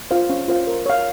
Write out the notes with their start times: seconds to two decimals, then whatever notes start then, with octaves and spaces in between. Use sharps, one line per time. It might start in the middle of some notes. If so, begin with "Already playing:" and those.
0.11 F4 C5 F5
0.30 C#4
0.48 F4 C5 F5
0.67 A#4
0.86 C#5 F5